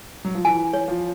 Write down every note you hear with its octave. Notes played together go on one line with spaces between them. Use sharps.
F#3
F3
E3 G#5
C#5
F3